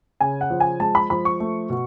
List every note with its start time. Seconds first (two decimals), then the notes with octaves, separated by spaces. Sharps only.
0.21 C#3 G#5
0.41 F#5
0.50 F3
0.60 G#5
0.80 G#3 A5
0.95 B5
1.10 F3 B5
1.25 C#6
1.40 A3
1.70 B2